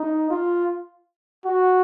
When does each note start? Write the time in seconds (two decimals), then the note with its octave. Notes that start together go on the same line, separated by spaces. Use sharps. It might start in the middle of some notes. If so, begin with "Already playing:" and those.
Already playing: D#4
0.30 F4
1.45 F#4